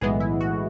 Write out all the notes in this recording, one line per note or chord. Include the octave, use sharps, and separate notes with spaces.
B1 A2 E3 G#3 B3 G#4
E4
F#4